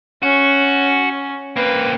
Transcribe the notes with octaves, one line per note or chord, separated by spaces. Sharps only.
C#4 F#4
A#3 C4 B4